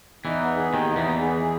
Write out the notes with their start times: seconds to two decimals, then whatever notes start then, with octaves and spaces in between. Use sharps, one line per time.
0.25 E2 E3 D#4
0.42 B3
0.57 G#4
0.73 D#2 D#3 D#4
0.90 D#4
0.96 E2 E3
1.05 B3
1.21 G#4
1.37 G#4